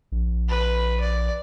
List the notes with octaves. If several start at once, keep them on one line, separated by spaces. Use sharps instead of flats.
A#1
B4
D5